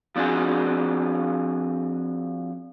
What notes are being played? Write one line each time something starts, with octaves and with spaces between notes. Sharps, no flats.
F3 C4 D4 F#4 G#4